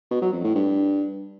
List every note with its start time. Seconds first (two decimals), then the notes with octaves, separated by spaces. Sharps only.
0.11 B2
0.22 F#3
0.33 F2
0.44 A2
0.55 G2